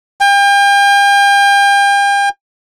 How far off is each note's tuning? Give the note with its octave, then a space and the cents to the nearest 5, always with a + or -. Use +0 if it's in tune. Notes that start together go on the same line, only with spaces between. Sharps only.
G5 +40